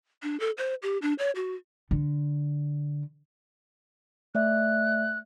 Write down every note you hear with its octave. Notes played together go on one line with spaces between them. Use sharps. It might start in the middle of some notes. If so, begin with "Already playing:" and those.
D4
A4
C5
G4
D4
C#5
F#4
D3
A3 D5 E5 F#6